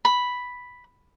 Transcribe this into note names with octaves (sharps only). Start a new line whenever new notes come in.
B5